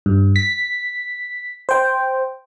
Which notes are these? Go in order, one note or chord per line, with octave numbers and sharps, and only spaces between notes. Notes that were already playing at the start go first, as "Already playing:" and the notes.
G2
B6
C5 G5